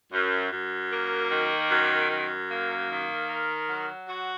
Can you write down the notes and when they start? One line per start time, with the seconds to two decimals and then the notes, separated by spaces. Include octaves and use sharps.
0.13 F#2
0.52 F#2
0.92 A#3
1.31 D#3
1.71 F#2
2.10 F#2
2.50 A#3
2.89 D#3
3.29 A#4
3.68 F#3
4.07 F#4